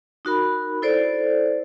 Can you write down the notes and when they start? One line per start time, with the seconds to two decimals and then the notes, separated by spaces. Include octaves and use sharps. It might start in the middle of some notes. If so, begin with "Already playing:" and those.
0.25 D#4 F#4 A#4 B5
0.82 E4 A4 C5 D5